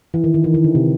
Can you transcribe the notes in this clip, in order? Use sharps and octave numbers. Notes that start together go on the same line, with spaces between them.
E3
D#3
D#3
E3
D#3
D3
C3